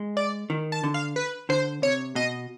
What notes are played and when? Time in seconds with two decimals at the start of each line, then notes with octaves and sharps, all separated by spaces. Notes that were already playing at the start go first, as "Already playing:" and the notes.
Already playing: G#3
0.17 D5
0.50 D#3
0.72 A5
0.84 D3
0.94 F5
1.16 B4
1.49 D3 C5
1.82 C3 C#5
2.15 B2 D#5